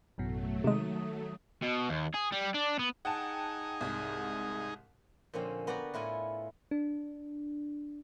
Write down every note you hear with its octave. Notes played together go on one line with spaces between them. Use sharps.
A1 F#2 B2 F#3 A3
C3 D#3 G#3 D#6
B2
D#2
G#4
G3
D4
B3
D#4 G#4 F#5 G5 A5
C2 G#2
A#2 D3 F3 C4 C#4
B3 F#4 B4 D5 G5 A#5
A2 E4 F4 G#5
D4